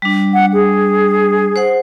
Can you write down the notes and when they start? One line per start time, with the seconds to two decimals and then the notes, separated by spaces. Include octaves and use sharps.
0.02 G3 D4
0.34 F#5
0.54 G#4
1.56 C5 F#5